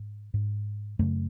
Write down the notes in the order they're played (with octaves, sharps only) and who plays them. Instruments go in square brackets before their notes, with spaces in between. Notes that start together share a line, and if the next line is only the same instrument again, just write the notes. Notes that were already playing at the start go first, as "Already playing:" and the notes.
Already playing: [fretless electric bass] G#2
G#2
F#2 C#3 A3